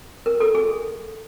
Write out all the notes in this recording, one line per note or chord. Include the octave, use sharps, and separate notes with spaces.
A#4
A4
G#4